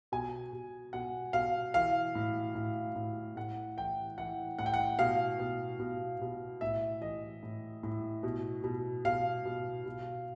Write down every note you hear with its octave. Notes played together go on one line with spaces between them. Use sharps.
B2 G#5
B2
B2 F#5
B2 F5
E3 F5
A2
A2
A2
A2 F#5
E3 G5
E3 F#5
A2 F#5
G5
F#5
B2 F5
B2
B2
B2
A2 E5
E3 D#5
A2
A2
B2
B2
B2 F5
B2
B2